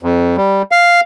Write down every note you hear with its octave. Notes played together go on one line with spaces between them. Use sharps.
F2
G3
F5